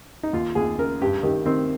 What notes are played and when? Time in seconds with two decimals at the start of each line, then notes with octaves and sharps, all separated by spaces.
0.23 D#4
0.33 D#2 F4
0.55 D#2 G#4
0.78 C#3 A#4
1.02 G2 G4
1.23 D#3 G4
1.46 D#3 C4